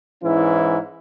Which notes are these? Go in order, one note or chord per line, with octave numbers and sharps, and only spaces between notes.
G#2 E3 C#4 E4